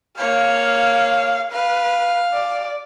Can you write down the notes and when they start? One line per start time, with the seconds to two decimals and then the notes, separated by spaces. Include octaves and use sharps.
0.18 A#3 C#5 F5
1.52 B4 F5
2.34 D5